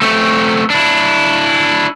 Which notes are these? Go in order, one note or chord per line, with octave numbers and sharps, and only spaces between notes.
A3 C4
D4 E4